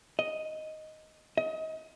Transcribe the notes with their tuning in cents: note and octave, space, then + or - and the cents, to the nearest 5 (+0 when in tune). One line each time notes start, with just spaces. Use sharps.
D#5 +0
D#5 +30